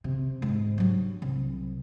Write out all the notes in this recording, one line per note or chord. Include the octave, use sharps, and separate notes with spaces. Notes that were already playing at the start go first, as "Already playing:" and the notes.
C3
G#2
G2 F#3
C2